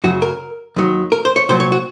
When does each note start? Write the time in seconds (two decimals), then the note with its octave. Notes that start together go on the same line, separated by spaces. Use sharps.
0.04 F#2 C#3 F#3 F#4
0.22 A#4
0.76 D#2 D#3 F#3
1.12 A#4
1.25 C5
1.36 C#5
1.49 C2 A#2 F#3 C5
1.60 C#5
1.72 F#4